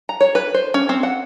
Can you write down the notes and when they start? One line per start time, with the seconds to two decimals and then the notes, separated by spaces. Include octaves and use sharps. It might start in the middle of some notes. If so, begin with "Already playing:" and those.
0.09 A#5
0.21 C#5
0.35 B4
0.54 C5
0.74 C#4
0.89 C4
1.03 F#5